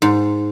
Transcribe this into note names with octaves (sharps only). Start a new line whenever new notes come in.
G#2